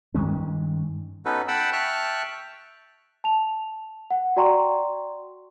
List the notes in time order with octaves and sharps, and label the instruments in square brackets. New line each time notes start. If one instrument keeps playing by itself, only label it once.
[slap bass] G2 D#3 G#3 C#4
[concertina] B3 C#4 D#4 F#4 A4 B4
F#5 G5 A5 B5 E6
E5 G5 A5 C#6 F6 F#6
[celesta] A5 F7
F#5
F#4 D5 G5 A#5 C6 C#6